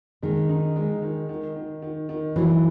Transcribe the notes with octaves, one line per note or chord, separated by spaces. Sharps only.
D#3 G#3
D#4
G#3
D#3
D#3
D#3
D#3
D#3
E3 F#3